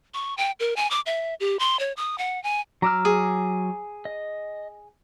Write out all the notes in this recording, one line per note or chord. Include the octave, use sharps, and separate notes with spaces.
C#6
G5
A#4
G#5
D6
E5
G4
C6
C#5
D#6
F#5
G#5
F#3 A#5 D6 E6 F6
G#4
D#5